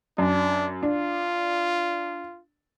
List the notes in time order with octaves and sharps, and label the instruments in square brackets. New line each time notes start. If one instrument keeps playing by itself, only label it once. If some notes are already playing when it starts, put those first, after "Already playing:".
[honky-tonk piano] F#2 [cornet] D4
[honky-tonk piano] D4 [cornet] F4